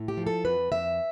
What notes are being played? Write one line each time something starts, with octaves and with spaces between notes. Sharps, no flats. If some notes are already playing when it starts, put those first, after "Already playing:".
Already playing: A2
G4
F3
A4
F2 B4
F2 E5